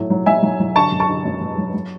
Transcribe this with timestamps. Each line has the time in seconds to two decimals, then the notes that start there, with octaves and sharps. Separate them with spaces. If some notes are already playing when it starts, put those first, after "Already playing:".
Already playing: A2 F#3
0.10 F#3
0.26 F#3 E5 G#5
0.43 F#3
0.60 F#3
0.76 D3 A5 C#6
0.92 F#2
1.00 A5 C#6
1.08 D3
1.25 F#2
1.41 F#2
1.58 F#3
1.74 F#3